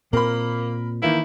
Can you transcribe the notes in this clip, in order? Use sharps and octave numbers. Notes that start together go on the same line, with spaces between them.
A#2 A#3 C4 A#4 B5
D#3 E3 A#3 E4